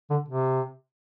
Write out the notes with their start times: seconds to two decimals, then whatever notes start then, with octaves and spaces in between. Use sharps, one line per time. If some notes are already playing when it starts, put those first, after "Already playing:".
0.10 D3
0.28 C3